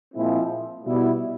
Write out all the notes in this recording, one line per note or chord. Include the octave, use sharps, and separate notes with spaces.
A#2 F3 G#3 C4 E4
B2 G3 B3 E4